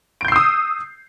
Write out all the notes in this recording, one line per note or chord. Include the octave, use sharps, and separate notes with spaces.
D#6 E6 G6 C7 D7